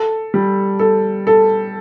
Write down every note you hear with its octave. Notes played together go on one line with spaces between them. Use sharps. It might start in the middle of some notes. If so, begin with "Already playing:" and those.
Already playing: A4
G3
A4
A4